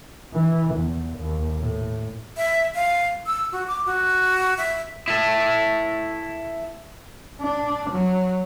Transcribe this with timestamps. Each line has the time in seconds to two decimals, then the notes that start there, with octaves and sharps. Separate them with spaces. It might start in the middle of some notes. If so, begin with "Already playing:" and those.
0.34 E3
0.74 E2
1.18 D#2
1.58 A2
2.37 E5
2.75 F5
3.27 E6
3.52 F#4
3.68 D6
3.86 F#4
4.58 E5
5.08 E4 A4
7.41 D4
7.90 F#3